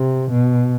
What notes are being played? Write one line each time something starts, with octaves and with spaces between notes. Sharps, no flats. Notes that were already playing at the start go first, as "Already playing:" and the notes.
Already playing: C3
B2